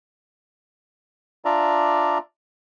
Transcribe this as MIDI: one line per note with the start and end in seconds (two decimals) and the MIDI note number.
1.45 2.18 62
1.45 2.18 65
1.45 2.18 74
1.45 2.18 76
1.45 2.18 82